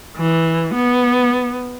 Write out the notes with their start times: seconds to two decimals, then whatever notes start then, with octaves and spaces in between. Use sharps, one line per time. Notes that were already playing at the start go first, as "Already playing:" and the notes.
0.17 E3
0.74 B3